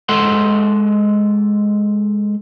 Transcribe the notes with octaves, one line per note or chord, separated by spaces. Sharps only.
G#3 A4 F#5 C6